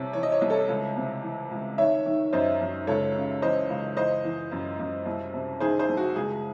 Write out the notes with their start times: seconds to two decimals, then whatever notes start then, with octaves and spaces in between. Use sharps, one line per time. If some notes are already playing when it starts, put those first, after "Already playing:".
Already playing: C2 C3 C#5
0.13 E3 C#5
0.23 D#5
0.32 C#5
0.41 C2 D#5
0.50 A4 C#5
0.68 C#2
0.96 C3
1.23 E3
1.51 C#2
1.78 D#3 C#5 E5
2.06 D#3
2.33 F#2 C5 D#5
2.61 F#2
2.87 C#2 A4 C#5
3.15 C#3
3.42 E3 C5 D#5
3.70 C#2
3.96 E3 C5 D#5
4.24 E3
4.52 F#2
4.79 F#2
5.06 C2
5.34 C3
5.60 D#3 G#4 C5
5.79 G#4 C5
5.89 C2
5.97 F#4
6.16 C#2 G#4